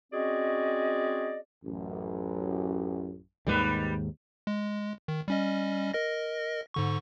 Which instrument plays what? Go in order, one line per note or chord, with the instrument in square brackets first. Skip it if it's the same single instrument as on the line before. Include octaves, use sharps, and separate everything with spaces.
[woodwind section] C4 C#4 F#4 G#4 D5 D#5
[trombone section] A1 F#2
[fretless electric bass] D#2 G#2 D#3 [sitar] G3 B4
[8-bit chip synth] G#3
D#3
G3 C#4 D#5
A#4 D#5 A#6
G#2 D3 C#6